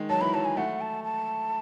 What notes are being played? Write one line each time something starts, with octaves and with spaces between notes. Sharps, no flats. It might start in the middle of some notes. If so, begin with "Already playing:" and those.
Already playing: D#3 G#3
F#3 A5
E3 B5
F#3 A5
G#5
A3 F#5
A5
A5